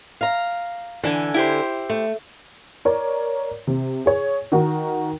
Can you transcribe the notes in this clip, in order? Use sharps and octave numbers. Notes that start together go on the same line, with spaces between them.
F5 A#5
D3 E3 A4 G#5
E4 G4 C5
A3
A#4 C#5 D5
C3
G#4 C#5
D#3 D#4 F#4 A#4